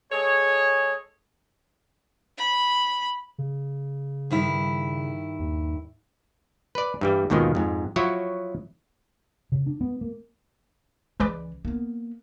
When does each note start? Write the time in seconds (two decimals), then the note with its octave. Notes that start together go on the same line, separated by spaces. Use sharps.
0.12 G#3 G#4 A4 C#5
2.38 B5
3.38 C#3
4.31 G2 D#3 E4
5.39 D#2
6.75 B4 D5
7.01 G2 E3 G3
7.30 D#2 G#2 B2 D#3 F3
7.55 F2 G#2
7.96 F3 F#3 E4 F#4 C#5
9.52 C#3
9.66 D4
9.81 B3
10.01 A#3
11.20 C#2 E3 G#3 B4 D5
11.65 A#3 B3